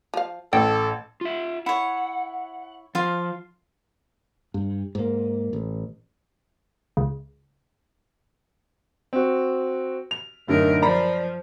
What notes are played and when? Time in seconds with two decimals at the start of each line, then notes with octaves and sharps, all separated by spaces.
0.14 F3 F5
0.53 A1 A4 G5
1.21 F4 E5
1.66 E4 C#5 F#5
2.95 F3 F4 F5
4.54 G2
4.95 G#2 A#3
5.53 A1
6.97 C#2
9.13 C4 F#4
10.11 F7
10.48 F#2 A2 D3 D#4 A#4
10.82 F3 D5 A#5 B5